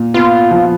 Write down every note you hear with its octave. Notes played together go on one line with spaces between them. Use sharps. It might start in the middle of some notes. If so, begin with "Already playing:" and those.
Already playing: A#2
B3 F4
F3